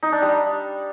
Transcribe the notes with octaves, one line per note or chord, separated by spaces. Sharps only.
D#4
D4
G3